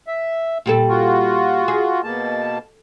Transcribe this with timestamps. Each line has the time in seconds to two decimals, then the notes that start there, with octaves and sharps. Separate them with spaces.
0.07 E5
0.66 A#2 G3 A4
0.89 F4 F#4
1.68 G#4
2.04 B2 A#3 A5